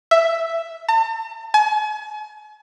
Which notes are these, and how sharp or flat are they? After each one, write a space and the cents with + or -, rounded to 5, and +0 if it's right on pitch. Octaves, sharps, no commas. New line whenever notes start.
E5 +5
A5 +45
G#5 +40